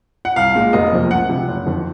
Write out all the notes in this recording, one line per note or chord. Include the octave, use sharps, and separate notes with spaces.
F#5
C2 F5
A#2 G#3
F1 D#5
F2 C3 F3 A#3
C#2 F#5
C3 F3
F#1
F2 D#3